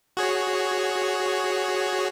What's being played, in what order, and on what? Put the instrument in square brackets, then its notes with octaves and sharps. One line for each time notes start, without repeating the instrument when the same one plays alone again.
[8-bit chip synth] F#4 G#4 C#5